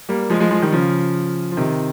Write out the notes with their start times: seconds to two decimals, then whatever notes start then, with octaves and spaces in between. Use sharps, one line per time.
0.09 G3 A#3
0.30 F3 G#3
0.40 F3 G#3
0.51 F3 G#3
0.62 D#3 G3
0.72 C#3 F3
1.51 F3
1.57 C3 D#3